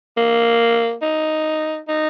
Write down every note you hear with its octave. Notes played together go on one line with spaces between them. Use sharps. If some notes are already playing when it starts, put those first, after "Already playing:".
A#3
D#4
D#4